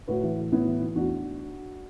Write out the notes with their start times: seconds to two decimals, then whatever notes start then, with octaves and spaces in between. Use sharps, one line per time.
0.08 A2 F#4 B4
0.23 E3
0.38 A2
0.51 A2 B3 E4
0.66 E3
0.81 E3
0.95 E2 D4 F#4